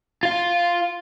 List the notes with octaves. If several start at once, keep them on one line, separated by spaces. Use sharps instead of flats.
F4 F5